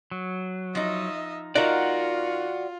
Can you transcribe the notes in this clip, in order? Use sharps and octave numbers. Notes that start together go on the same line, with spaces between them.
F#3
F3 D#4 D#5 E5
D#4 F4 F#4 A#4 D5 F#5